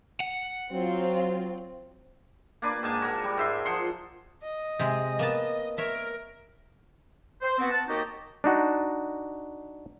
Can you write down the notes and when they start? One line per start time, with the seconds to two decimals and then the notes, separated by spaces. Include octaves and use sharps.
0.20 F#5
0.72 F#3 C4 F4
2.62 A#3 D4 B4 D5
2.83 G#2 G#5 A5
3.02 F#4 A#4
3.24 G3
3.37 G#2 E5 C6
3.65 F3 F#5 C6
4.43 D#5
4.79 C3 G#3
5.19 A#3 B3 A5
5.78 A#4 C#5 E5
7.42 C5
7.59 B3 C4 F#4
7.71 F#5 A5
7.87 D#2 A#3 D#4 F#4 G4 D#5
8.44 D4 D#4 F#4